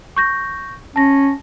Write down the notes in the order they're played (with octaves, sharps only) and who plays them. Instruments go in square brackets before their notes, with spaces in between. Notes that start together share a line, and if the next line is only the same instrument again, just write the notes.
[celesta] C#6 G6 A#6
[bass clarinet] C#4 [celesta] A5 A#6